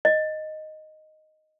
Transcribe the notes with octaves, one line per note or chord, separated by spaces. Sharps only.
D#5